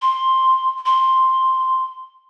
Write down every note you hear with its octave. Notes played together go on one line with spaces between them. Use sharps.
C6
C6